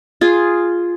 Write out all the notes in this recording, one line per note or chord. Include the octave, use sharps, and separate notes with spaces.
F4 G#4